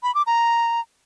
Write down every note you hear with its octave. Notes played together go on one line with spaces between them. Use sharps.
B5
D6
A#5